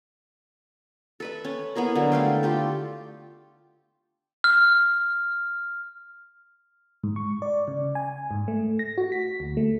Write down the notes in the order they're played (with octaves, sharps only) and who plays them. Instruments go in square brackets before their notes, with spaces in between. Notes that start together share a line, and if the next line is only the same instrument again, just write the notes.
[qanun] A4 B4 E5
C#4
B3 E4 G#4 A#4
D3 F#3 G#3
A3 F5 G5
F4 G4 A4
[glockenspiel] F6
[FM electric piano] G#2
C#6
D5
C#3
G#5
G#2
A3
A#6
F#4
B6
D2
A3